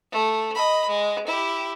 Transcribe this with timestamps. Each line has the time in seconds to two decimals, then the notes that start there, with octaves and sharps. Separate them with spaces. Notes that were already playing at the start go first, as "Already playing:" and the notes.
0.11 A3
0.55 D#5 B5
0.88 G#3
1.27 E4 G4